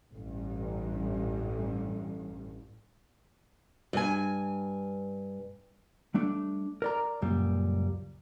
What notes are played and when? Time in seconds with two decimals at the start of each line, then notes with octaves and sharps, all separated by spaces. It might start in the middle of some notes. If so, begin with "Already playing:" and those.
0.14 A1 G2
3.93 G2 G#5
6.14 G3 A3 D4
6.82 A#4 D5 A#5
7.21 C#2 F#2 A#2 G3